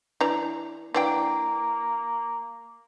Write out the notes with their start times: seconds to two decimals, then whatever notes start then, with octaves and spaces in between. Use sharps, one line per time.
0.21 E3 D4 A#5
0.94 E3 A#3 D4 G5